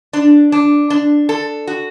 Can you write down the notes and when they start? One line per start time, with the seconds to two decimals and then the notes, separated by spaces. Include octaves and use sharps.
0.13 D4
0.52 D4
0.90 D4
1.29 A4
1.67 F#4